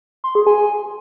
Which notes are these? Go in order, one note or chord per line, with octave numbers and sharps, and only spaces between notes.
C6
G#4
G#5